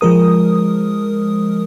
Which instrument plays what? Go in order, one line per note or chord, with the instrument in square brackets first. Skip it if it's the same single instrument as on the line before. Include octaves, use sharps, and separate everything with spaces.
[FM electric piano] F3 G#3 A#4 D#6